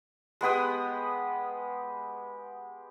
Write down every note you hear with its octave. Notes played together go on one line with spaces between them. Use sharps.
G#3 B3 G4 D#6